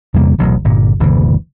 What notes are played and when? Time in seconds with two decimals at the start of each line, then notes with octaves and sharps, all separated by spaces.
0.14 E2 C3 G3 A#3
0.38 D1 A1 B2 F#3
0.64 G1 A#2
1.00 F#1 D2 B2 E3